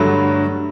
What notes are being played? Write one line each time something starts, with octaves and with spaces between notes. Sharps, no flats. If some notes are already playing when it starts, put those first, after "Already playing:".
Already playing: G2 D3 F#3 A3